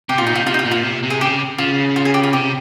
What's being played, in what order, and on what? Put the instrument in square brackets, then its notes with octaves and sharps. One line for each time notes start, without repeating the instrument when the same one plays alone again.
[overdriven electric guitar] C3 [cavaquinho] G4
[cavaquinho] F4
[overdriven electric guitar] A#2
[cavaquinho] D#4
[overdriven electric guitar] C3 [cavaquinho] F4
[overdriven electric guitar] C3 [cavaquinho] F4
[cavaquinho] D#4
F4
[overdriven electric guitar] A#2
[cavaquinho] F4
[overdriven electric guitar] C3
C3
[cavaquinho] G#4
[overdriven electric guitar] C#3 [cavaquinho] G4
[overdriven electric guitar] C#3 [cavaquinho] F4
[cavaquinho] F4
G#4
G4
F4
[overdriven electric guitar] C3 [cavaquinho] G4